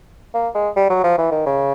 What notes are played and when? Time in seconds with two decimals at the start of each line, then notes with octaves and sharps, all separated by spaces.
0.34 A#3
0.55 G#3
0.76 G3
0.90 F#3
1.04 F3
1.18 E3
1.32 D#3
1.46 C#3